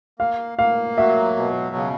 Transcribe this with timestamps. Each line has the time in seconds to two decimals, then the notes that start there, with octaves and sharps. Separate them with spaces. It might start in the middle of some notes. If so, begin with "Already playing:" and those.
0.19 A#3 F5
0.59 A#3 F5
0.98 F#3 E5
1.36 B2
1.76 C#3